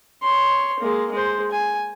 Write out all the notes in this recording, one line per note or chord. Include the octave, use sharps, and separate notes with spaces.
C#5 C6
G#3 A#3
G#3 C5
G#5